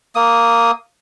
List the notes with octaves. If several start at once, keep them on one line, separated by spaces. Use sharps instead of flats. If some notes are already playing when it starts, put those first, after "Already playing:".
A#3 D#6